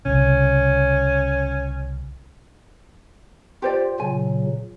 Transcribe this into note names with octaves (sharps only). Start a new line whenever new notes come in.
C2 C#3 C#4
F4 G4 C5 D5
A#2 C#3 F#3 G#5